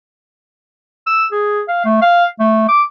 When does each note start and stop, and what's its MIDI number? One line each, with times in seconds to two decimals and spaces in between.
1.07 1.25 88
1.32 1.62 68
1.68 1.85 77
1.85 1.98 57
2.02 2.25 77
2.40 2.68 57
2.69 2.82 86